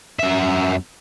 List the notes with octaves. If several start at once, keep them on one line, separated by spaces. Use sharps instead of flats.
F#2 E5